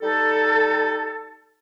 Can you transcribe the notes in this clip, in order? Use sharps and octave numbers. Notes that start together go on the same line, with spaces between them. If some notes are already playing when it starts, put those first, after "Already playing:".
G3 D#4 A4